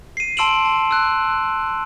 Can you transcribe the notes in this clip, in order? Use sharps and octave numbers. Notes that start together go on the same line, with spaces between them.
C7 D#7
A5 C6 E6 D7 E7 F#7
A5
E6 F#6